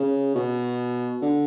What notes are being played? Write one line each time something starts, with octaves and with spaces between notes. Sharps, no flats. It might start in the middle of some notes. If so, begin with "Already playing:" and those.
Already playing: C#3
B2
D3